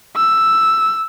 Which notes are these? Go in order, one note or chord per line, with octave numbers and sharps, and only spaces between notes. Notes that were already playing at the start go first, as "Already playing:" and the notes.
E6